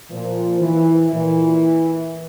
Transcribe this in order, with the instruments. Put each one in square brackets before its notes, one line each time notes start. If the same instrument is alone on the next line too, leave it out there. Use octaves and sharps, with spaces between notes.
[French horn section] A#2 F3
E3
A#2 E3